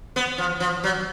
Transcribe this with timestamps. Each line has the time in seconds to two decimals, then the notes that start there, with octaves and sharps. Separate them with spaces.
0.16 B3
0.38 F3
0.60 F3
0.84 F#3